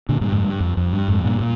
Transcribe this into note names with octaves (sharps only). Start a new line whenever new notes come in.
A#2 D3
G2 A#2
F2 G#2
G2
F2
F2
G2
F2 G#2
G2 A#2
A#2